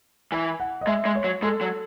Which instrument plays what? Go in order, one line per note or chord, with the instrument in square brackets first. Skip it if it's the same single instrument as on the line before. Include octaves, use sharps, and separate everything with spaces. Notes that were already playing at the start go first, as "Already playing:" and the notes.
[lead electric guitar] E3 [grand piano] G#5
[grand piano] F#5
D#5
[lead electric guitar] G#3 [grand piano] E5
[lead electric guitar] G#3
[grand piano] C#5
[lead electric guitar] F#3
[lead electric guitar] G#3 [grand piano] A4
[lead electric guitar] F#3